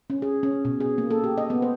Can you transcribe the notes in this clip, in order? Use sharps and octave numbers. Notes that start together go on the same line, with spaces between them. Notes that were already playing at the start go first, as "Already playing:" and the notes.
C#4
G#4
C#4
B2
G#4
A#3
A4
G4
D#5
B3
C5